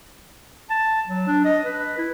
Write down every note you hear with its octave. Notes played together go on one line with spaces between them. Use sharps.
A5
F#3
D4
D#5
B4
E4